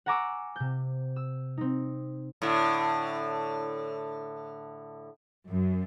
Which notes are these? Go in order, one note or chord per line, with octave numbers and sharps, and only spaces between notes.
F#5 G#5 A#5 C#6 D6 E6
C3 G6
E6
C4 D#4
A2 D3
F#2